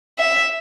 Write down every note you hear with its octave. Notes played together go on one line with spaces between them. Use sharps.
E5